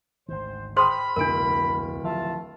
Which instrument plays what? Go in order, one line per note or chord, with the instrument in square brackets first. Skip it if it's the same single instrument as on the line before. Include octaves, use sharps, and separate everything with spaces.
[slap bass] G#1 D2 D#3 [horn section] C5
[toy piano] G#4 C5 C6 [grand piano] G5 D#6 F6 [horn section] B5
[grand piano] D1 D7 [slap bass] C2 F2 B3 [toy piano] D4 A#4
[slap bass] D#3 F3 F#3 [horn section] F4 E5 A5